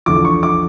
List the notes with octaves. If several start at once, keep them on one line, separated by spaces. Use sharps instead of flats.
E2 D3 F3 D6
C#6
D6